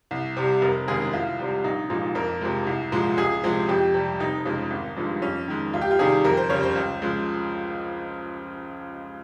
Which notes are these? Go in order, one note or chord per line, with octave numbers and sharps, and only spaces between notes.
C2
C3 G3
F1 A#4
D#2 C#3 G#3 G#4
C2 F4
C3 G3
A#1 D#4
A#2 F3 G#3 D#4
F2 A#4
C3 F3 G#3
C2
A#2 F3 G#3
C#2 G#4
C3 F3 G#3
F2 G4
C3 G3
F1 D#4
F2 C#3 F3 G#3
G#1
G2 F3 G#3
F2 C#4
D#3 G#3
C#2 F4
G4
F4
C3 D#3 G3 G#4
F2 A#4
C5
C#3 G3 C#5
C5
C#2
C#3 F3 G#3